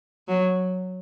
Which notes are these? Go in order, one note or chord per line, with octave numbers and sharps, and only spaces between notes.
F#3